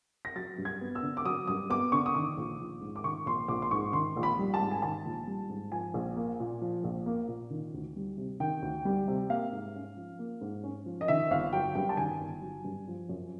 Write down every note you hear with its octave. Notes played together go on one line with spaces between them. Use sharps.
A#6
F#3 A6
G2
G#6
B3
E6
D3
D6
F#3 D#6
G2 D#6
B3 D6
D3 C#6
D#6
D#3 D6
A#1
A#1
G#2
D6
D#3 C#6
A#1 C6
A#1 D6
C6
G#2 C#6
D#3 C6
A#1
B5
G3
A5
G#2
G#5
D#3 A5
A#1
G3
G#2
F3 G#5
A#1
A#3
A#2
F3
A#1
A#3
A#2
D#3
D2
G3
C3
D#3 G5
D2
G3
C3
A#3 F5
G#2
C#4
F3
A#3
G#2
C#4
F3
D#5
D#3 E5
G1 F5
F#3 G5
G2 G5
A5
D#3 G#5
G1
F#3
G2
F3
F#2